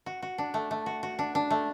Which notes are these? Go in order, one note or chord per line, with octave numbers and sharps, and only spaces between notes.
F#4
F#4
D4
A3
A3
F#4
F#4
D4
D4
A3